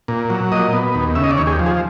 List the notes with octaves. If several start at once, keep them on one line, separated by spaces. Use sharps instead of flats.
A#2
F#3
A#2 D#5
B3
D#2
C#3 E5
D#5
D5
D#2 C#5
G#4
G4
F3
G#4